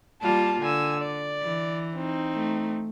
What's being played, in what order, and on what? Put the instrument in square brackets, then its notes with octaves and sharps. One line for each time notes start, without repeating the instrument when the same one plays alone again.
[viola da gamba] G3 A#3 F4 [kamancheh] A5
[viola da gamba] D3 [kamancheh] G#5 E6
[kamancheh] D5
[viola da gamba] E3
[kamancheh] C4 D#4
[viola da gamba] A3